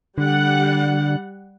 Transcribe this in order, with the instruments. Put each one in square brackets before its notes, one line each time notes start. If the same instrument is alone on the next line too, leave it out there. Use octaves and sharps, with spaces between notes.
[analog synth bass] D3 [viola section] G3 F#5